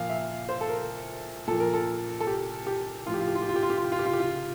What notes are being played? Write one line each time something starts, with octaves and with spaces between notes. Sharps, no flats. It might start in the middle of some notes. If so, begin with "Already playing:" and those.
Already playing: A#2 F3 F5
E5
C5
A4
A#4
A#2 F3 A4
A#4
A4
A4
G4
G4
A2 F3 F4
G4
F4
G4
F4
G4
F4
G4
F4
G4
F4
G4
F4
G4
F4
G4
F4